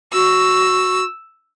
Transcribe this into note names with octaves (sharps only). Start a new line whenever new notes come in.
F#4 E6